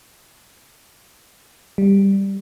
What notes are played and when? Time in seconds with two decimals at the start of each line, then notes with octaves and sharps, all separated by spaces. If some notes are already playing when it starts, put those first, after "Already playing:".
1.78 G3